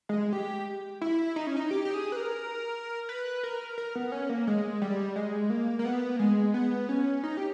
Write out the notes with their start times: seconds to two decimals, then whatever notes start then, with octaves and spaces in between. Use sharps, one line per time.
0.09 G#3
0.33 G4
1.01 E4
1.36 D#4
1.47 C#4
1.57 D#4
1.71 G4
1.85 G4
1.94 G#4
2.12 B4
2.16 A#4
3.09 B4
3.43 A#4
3.78 A#4
3.95 B3
4.12 C#4
4.29 A#3
4.47 G#3
4.82 G3
5.16 G#3
5.50 A#3
5.79 A#3
5.85 B3
6.16 A#3
6.19 G#3
6.54 B3
6.89 C#4
7.24 D#4
7.37 G4